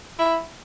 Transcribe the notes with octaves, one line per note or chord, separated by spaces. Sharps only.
E4